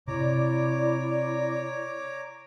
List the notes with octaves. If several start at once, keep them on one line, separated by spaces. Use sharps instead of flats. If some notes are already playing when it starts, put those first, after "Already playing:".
C3 E4 C#5 D5 A#5 D6